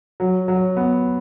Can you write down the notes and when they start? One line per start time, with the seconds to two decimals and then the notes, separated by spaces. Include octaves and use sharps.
0.20 F#3
0.48 F#3
0.77 B3